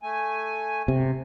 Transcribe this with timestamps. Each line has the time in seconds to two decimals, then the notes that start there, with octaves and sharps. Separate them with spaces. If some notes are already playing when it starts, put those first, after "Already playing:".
0.03 A3 G#5
0.88 C3